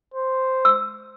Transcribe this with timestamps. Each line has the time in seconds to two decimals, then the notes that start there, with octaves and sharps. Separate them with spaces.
0.14 C5
0.65 E6